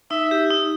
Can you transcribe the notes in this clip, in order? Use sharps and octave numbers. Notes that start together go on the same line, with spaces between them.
D#4 E5
G4
D#4